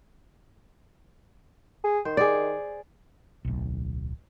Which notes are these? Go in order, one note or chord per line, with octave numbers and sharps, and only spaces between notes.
G#4
D#3 C5
G#4 D5
D1 B1